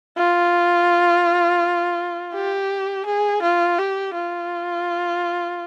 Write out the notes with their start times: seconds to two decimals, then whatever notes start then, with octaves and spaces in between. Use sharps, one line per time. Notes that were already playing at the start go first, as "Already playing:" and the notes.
0.18 F4
2.34 G4
3.06 G#4
3.42 F4
3.79 G4
4.14 F4